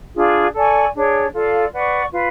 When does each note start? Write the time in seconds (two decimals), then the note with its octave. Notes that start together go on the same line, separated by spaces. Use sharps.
0.15 D4 F4 G#4
0.54 A4 D5 G#5 C#6
0.94 D4 G#4 C#5
1.33 F4 A4 D5 F5
1.72 B4 D5 F#5 C#6
2.12 F4 B4 F5